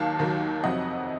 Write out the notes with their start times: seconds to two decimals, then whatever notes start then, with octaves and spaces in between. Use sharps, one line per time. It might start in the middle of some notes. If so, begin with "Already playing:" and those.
Already playing: D#2 D#3 F#3 F5 A5
0.19 D#2 D#3 F#3
0.64 F2 C3 F#3 D#5 F#5